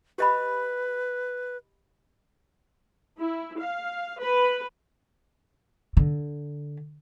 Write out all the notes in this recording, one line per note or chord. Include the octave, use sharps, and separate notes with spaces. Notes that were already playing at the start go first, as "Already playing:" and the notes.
G4 B4 D#5 B5
E4
F5
B4
D3